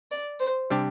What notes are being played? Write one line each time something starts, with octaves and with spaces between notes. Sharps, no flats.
D5
C5
C3 G3 D4 G4